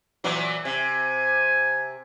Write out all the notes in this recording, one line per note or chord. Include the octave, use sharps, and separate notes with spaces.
A#2 E3 F#3
C3 G#5